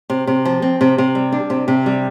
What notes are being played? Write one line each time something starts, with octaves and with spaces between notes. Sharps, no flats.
C3
C3
F3
C4
C3
C3
G3
D4
C3
C3
G3